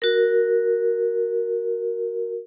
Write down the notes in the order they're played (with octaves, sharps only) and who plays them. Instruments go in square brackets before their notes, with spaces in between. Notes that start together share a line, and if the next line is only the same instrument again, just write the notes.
[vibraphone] F#4 A#4